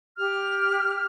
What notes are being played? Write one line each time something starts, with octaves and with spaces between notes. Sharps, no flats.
G4 F6